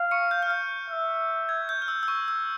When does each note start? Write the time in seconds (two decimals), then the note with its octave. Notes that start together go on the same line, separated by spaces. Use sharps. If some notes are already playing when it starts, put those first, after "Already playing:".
Already playing: F5
0.11 C#6 C#7
0.31 G6
0.43 F6
0.51 G6
0.90 E5
1.49 G#6
1.69 G6
1.82 F6
1.88 E6
2.03 E6
2.08 C#6
2.28 E6